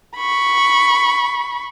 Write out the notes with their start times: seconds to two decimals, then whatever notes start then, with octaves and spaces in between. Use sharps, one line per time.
0.16 B5 C#6